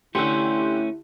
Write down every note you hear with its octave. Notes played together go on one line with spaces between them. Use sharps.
D3 A3 C#4 E4 G4 C6 E6